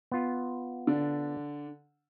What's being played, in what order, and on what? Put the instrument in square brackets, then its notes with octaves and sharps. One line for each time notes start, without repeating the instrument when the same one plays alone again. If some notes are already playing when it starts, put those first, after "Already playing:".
[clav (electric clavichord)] B3 F4
[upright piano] D3 D4